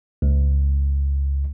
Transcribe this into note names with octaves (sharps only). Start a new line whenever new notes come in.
C#2